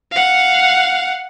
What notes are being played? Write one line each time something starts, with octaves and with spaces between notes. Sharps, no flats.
F5 F#5